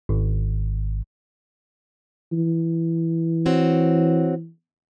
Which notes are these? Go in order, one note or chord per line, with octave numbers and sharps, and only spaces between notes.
G#1
E3
C4 F#4 C#5